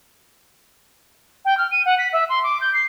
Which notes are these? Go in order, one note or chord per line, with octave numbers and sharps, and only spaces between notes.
G5
F6
D#7
F#5
B6
E5
C6
D6
G6
C7